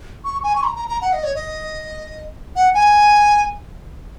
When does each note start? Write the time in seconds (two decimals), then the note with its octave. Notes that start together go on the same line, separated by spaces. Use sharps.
0.24 C#6
0.43 G#5
0.55 C#6
0.63 A#5
0.76 A#5
0.88 A#5
1.01 F#5
1.13 D#5
1.23 C#5
1.35 D#5
2.56 F#5
2.74 G#5